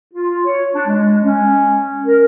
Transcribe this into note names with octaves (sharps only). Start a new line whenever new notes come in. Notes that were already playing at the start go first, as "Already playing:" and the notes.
F4
C#5
D4
G#3
C#4
A#4